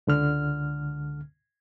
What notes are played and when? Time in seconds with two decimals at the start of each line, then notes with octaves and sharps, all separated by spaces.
0.07 C#2 D3 F6